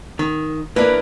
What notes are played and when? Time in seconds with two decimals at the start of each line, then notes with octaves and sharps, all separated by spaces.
0.19 D#3
0.76 E3 A#3 D4 A#4 B4